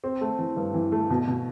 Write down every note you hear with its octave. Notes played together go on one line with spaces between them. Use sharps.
C4
A3
E3
G2
E3
A3
B2
B2